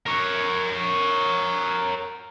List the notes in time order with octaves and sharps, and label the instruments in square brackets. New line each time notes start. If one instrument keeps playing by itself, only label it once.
[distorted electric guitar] A#4 C#5